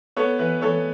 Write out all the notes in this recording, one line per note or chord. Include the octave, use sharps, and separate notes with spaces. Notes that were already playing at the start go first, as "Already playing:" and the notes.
B3 A4 C#5
E3 B4
E3 A4 C#5